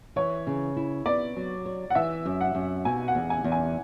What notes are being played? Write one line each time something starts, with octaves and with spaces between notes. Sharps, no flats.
E3 C#5
C#3
E4
B3 D5
F#3
C#5
F#5
E3 E5
F#2
F#5
F#2
B2 G#5
F#5
E2
G#5
E2
G#5